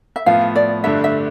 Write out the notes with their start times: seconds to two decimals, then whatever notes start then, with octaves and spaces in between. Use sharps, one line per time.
0.16 E5
0.26 A2 F3 B3 F5
0.55 D5
0.84 G2 D3 A3 D4 E5
1.04 E5